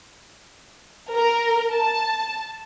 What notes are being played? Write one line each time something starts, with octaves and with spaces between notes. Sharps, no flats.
A#4
A5